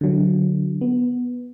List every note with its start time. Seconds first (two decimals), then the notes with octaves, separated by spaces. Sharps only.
0.01 D3 F#3
0.81 B3